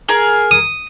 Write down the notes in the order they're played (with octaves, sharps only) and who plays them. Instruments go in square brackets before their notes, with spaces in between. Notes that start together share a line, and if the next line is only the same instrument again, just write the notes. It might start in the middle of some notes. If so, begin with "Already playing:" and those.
[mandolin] G#4 A#4
[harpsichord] D#6